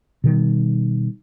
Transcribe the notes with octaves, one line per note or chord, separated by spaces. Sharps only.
B2 D#3 G3